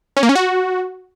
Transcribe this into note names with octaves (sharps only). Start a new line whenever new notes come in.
C#4
A#3
C#4
F#4